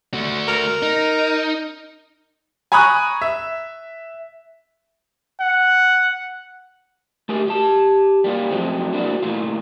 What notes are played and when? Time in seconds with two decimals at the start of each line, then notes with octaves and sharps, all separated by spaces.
0.14 A3 F#4
0.48 A#4
0.83 D#4
2.72 G#5 A#5 B5 C#6 D#6 F#6
3.22 E5
5.40 F#5
7.29 A3 G4 G#4 A#4
7.48 G4 A5
8.24 G3 A#3 F4
8.51 F3 F#3 G#3 A3 C4
8.93 A#3 D4 E4 F#4
9.23 A#2 E3 A3 A#3 F4